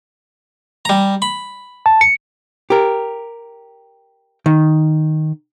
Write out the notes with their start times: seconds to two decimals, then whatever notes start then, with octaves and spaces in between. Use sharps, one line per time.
0.85 G3 A#5
1.22 B5
1.86 A5
2.01 C#7
2.70 G4 A#4
4.46 D#3